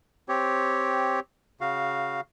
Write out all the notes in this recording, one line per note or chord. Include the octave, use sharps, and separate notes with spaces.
C4 G4 C#5
C#3 F#4 F5